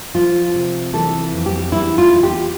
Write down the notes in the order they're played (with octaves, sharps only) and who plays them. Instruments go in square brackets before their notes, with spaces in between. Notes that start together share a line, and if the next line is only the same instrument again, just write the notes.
[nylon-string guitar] F3 F4
C3
E3 A4
F2
G4
E2 E4
F4
E2
G4